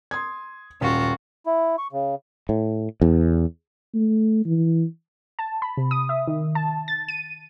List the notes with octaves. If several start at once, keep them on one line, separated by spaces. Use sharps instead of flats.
C6 D#6 G#6
D#1 F4 F#4
E4
C#6
C#3
A2
E2
A3
E3
A5
B5
C3
D#6
E5
D#3
A5
A6
D#7